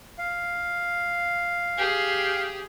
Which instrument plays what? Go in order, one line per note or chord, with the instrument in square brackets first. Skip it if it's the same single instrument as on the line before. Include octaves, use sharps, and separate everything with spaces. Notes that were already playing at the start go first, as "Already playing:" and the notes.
[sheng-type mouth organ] F5
[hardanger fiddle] G4 G#4